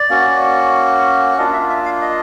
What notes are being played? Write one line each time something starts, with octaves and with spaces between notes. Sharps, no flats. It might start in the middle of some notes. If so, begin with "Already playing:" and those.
Already playing: D5
A#3 C#4 F#4
A#3 D4 F4 D#5
E5
E5
F5
D#5